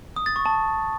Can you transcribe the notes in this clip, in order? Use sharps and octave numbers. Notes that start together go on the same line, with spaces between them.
D#6
A6
C#6
A5